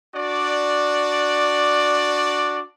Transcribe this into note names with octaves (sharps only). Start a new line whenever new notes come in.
D4 F#4 D5